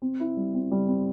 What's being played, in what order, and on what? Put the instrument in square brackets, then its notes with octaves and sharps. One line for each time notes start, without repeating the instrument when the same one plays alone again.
[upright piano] C4
E4
G3
C4
G3
C4